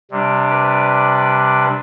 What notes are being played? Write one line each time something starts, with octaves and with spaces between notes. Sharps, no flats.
C3 G3 D4
B4